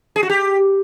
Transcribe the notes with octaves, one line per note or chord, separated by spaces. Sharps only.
G#4
F#4
G4